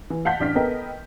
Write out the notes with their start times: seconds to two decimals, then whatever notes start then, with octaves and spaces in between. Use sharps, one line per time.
0.10 E3
0.25 F5 F#5 A5 G6 B6
0.40 A1 D4 F6 B6
0.55 B3 A4 A#4 D#5 G5